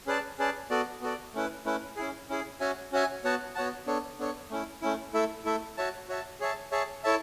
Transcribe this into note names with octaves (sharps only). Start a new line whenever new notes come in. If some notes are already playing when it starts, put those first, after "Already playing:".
C#4 G#4 B4 D5 A5
C#4 G#4 B4 D5 A5
B3 F#4 A4 D5
B3 F#4 A4 D5
A3 C#4 E4 B4
A3 C#4 E4 B4
C#4 E4 G#4
C#4 E4 G#4
C#4 F#4 C#5 E5 G#5
C#4 F#4 C#5 E5 G#5
B3 F#4 C#5 F#5 A5
B3 F#4 C#5 F#5 A5
B3 D4 A4 C#5
B3 D4 A4 C#5
A3 C#4 E4
A3 C#4 E4
A3 E4 A4 E5
A3 E4 A4 E5
F#4 C#5 E5 A5
F#4 C#5 E5 A5
G#4 C#5 E5 A5
G#4 C#5 E5 A5
E4 A4 C#5 E5 A5